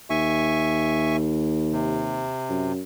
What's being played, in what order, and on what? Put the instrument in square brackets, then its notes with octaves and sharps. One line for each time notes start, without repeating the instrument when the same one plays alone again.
[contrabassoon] D#2 [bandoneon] E5 G#5 C#6
[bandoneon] C3
[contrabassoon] F#2